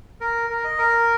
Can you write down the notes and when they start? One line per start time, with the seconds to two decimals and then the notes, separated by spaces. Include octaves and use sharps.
0.21 A#4
0.50 A#4
0.64 D#5
0.78 A#4